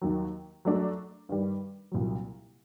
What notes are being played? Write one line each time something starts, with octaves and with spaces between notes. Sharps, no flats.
D#2 D#3 F#3
F#3 A3 D4 F#4 A4
G2 D#3 G3
C2 A#2 F#3